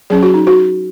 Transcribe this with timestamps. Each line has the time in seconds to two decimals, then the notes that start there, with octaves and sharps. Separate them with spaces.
0.10 F#3 C#4 G#4
0.23 F#4
0.34 D#4
0.47 F#4